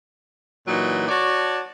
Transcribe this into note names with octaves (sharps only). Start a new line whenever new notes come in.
A#2 E3 F#3 D#4 F#4
F#4 C#5 D5 A5